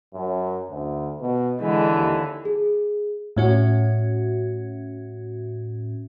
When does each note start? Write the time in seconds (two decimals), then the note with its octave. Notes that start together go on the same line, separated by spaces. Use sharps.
0.14 F#2
0.71 D2
1.21 B2
1.61 D3 E3 G#3
1.93 D#2
2.45 G#4
3.37 A2 C#4 F#4